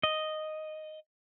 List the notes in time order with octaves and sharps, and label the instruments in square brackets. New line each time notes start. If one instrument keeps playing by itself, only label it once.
[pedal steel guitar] D#5